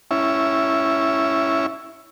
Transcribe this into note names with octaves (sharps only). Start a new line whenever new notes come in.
C#4 E4